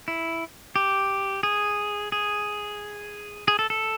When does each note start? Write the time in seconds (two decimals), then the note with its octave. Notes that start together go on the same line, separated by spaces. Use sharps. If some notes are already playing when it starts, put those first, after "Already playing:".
0.08 E4
0.76 G4
1.43 G#4
2.12 G#4
3.48 G#4
3.59 A4
3.70 A4